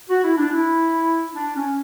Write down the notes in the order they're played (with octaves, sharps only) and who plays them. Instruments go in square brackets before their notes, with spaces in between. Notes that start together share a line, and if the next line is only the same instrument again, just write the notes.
[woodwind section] F#4
E4
D4
E4
D4
C#4